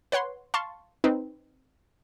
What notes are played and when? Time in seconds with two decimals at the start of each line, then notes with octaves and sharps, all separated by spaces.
0.12 B4 C#5 F#5 C6
0.54 F5 A5 C6 C#6 A6
1.04 C4 D#4 B4